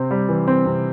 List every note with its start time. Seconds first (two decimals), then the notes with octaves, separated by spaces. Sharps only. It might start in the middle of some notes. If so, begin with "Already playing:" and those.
Already playing: C3 C4
0.11 G3
0.29 E3
0.48 C4
0.66 C3